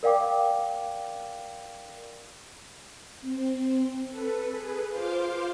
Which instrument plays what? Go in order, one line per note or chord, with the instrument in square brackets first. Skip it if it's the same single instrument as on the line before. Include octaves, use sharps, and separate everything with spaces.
[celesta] A#4 D5 F5 G5 D6
[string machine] C4
A4 B4
G#4 B4
F4 C5 F5 C6 D6